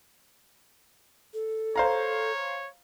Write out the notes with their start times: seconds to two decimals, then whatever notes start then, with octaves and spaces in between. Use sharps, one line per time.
1.34 A4
1.76 C5 C#5 F5 A#5